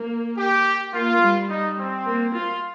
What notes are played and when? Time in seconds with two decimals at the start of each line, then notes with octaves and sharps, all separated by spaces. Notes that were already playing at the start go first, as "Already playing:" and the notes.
Already playing: A#3
0.37 G4
0.93 A#3 F4
1.22 G3
1.49 D#4
1.77 C4
2.05 A#3
2.34 F4